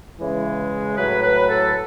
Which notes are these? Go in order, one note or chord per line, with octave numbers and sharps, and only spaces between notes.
C#3 E3 G#3
A2 F#3 B4
B4
A4